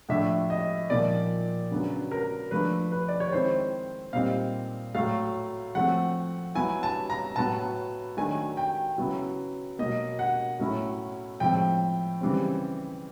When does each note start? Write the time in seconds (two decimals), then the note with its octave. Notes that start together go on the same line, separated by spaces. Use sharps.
0.09 A2 F3 A3 D4 E5
0.50 D#5
0.89 A#2 F3 A#3 D#4 D5
1.71 C#3 F#3 B3 D4
2.12 A#4
2.51 F3 A3 D4 B4
2.92 B4
3.08 D5
3.20 C#5
3.32 D#3 G#3 C4 E4 C5
4.13 A#2 G3 C4 D#4 F5
4.95 A2 F#3 A3 F5
5.75 F3 A3 C4 F#5
6.55 F#3 B3 E4 G#5
6.83 A5
7.10 A#5
7.36 A2 F#3 B3 A5
8.17 D#3 F#3 A3 D4 G#5
8.57 G5
8.98 C#3 F#3 B3 E4
9.79 B2 F#3 A#3 D#5
10.19 F#5
10.59 A2 F#3 A3 C#4 E4
11.40 A2 F3 G#3 C4 G5
12.21 C#3 E3 G3 C4